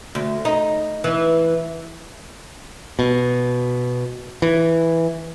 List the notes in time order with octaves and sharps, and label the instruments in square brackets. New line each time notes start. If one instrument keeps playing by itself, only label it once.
[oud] D2
D#4
E3
[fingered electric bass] B2
E3